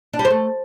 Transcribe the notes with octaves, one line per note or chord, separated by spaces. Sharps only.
D4
G3
C5
A3